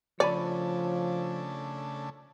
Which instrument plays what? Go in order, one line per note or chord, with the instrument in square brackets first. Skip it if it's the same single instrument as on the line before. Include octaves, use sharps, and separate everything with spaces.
[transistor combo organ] C#3 A3 D4 [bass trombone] F3 [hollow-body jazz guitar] C#5 G#5 B5 [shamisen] D5